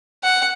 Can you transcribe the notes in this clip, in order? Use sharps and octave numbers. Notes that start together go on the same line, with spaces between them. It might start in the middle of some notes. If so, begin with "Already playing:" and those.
F#5